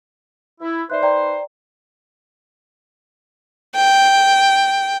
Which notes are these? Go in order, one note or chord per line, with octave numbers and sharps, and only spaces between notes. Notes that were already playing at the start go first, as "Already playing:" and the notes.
E4
D#4 B4 C5 D5 E5 F#6
D5 G5 A#5
G5